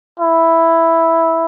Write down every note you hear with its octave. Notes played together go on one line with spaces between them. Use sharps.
E4